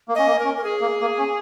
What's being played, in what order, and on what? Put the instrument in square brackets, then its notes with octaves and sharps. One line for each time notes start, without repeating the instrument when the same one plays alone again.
[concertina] A#3
[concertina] C#4 [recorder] D#5
[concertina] A#3
[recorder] A#4
[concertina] C#4
[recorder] A#4
G#4
[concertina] A#3
A#3
C#4